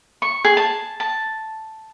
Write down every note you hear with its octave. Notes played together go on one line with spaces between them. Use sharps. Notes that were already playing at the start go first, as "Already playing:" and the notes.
C#6
G#4
A5
A5